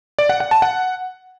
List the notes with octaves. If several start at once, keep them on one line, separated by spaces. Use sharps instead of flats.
D5
F#5
F#5
A5
F#5